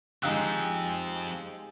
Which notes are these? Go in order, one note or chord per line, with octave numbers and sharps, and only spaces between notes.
F3 G#3 C4 D#4 G4 F5 E6 F#6